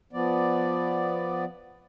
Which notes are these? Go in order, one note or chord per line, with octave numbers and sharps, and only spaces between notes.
F3 B3 D5